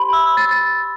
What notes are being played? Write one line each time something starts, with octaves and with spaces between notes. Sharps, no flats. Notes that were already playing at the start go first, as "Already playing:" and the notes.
Already playing: G4 C5 B5 C6
E6
A6